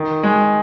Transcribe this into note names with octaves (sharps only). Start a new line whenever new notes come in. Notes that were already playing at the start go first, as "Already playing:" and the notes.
Already playing: D#3
G#3